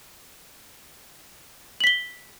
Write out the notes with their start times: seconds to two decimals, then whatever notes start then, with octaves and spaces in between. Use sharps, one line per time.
1.80 F#7
1.84 B6
1.87 G7